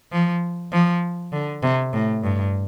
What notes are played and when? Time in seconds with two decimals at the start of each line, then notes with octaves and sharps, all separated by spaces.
0.12 F3
0.72 F3
1.32 D3
1.63 C3
1.93 A2
2.23 G2